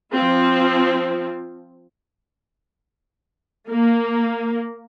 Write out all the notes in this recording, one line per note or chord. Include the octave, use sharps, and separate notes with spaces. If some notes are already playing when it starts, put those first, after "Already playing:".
F3 C4 F4
A#3